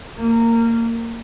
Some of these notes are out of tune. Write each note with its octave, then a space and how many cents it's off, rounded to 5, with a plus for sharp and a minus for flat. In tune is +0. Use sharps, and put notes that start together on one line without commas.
A#3 -20